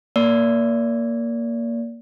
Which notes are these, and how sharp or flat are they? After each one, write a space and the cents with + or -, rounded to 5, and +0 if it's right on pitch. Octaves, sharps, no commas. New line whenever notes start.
A#3 +0 D5 -30